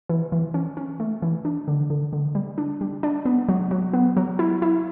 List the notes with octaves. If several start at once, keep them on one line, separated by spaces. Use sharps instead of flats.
E3
E3
C#4
C#4
A3
E3
D4
D3
D3
D3
G3
D4
G3
D4
B3
F#3
F#3
B3
F#3
E4
E4